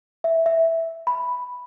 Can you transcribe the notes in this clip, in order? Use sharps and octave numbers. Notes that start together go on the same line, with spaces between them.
E5
E5
B5